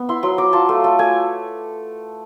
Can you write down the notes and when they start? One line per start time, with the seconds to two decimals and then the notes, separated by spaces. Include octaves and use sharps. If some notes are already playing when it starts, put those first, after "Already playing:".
Already playing: B3
0.09 E4 C6
0.23 F#3 C6
0.38 F#3 D6
0.53 F4 A5
0.69 A3
0.84 A3
0.99 A3 G#5